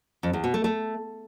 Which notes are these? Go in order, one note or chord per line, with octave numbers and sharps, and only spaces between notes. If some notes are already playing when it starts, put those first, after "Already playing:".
F2
E2
B2
A3
A3